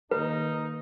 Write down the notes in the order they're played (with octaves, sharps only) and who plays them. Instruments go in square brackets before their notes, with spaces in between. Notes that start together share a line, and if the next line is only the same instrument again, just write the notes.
[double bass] D#3 A#3 [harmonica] D#4 [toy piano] B4